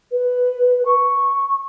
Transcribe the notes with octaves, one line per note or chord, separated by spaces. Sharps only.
B4
C#6